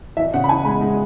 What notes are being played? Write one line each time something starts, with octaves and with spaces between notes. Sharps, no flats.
E3 E5
C#3 F#5
B5
E3 G#5
G#3 B5
G#3